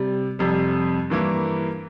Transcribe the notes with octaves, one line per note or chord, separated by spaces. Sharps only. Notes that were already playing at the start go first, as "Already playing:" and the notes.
Already playing: C3 G3
F2 C3 G3
G2 E3 A#3 E4 A#4